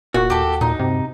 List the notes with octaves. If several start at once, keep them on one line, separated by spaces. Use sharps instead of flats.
E1 A#2 F#4
D#2 G4 A4
A#2 D#4
G2 C3